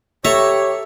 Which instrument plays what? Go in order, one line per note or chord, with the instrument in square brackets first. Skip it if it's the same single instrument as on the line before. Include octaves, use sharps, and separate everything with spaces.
[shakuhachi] G4 [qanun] A4 A#5 C#6 [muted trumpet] C#5 [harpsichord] E5